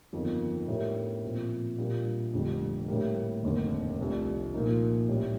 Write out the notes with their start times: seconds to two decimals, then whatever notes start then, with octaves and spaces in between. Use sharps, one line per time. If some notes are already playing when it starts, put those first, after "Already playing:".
0.13 G1 F2 D#3 A#3 F4
0.68 A2 A3 D4 G4 A#4
1.23 A#2 F3 C4
1.78 A#2 G3 A#3 D4 F4
2.33 F1 F2 D3 G3 D4
2.88 A2 G3 A#3
3.43 F1 D#2 D3
3.98 C2 C3 F3 A3 D4
4.54 A#2 F3 A#3 D#4
5.08 A1 A2 G3 D4